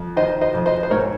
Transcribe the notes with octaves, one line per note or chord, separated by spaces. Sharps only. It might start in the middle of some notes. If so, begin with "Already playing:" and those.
Already playing: F2
D#3 C5 D#5
C5 D#5
F2
C5 D#5
C5
G#2 A#4 C#5